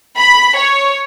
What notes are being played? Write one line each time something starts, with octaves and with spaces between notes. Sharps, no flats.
B5
C#5